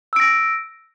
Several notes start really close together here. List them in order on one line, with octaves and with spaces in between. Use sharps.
E6 D7 A#6